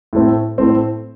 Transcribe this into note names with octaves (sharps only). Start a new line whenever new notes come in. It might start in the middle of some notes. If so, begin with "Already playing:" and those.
A2 A3 C4
A2 A3 C4